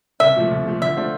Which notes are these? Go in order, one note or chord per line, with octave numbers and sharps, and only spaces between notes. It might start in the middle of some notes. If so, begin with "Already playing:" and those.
C2 E5
A#2 F3 A3
C2
A#2 F3 A3
D3 E5
A3 D4 F4 C5